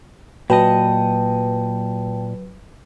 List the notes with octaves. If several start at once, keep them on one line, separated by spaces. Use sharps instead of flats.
A#2 F#3 B4 D#5 G5 A5